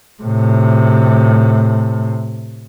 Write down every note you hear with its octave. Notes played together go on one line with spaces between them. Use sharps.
A2 C3